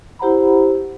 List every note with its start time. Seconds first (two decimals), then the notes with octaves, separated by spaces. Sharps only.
0.19 E4 G4 C5 F#5 A#5 B5